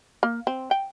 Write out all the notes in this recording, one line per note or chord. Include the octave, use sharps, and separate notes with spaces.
A#3
C4
G5